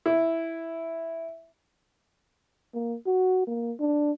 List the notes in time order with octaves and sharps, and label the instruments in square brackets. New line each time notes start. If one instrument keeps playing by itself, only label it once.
[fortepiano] E4
[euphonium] A#3
F#4
A#3
D4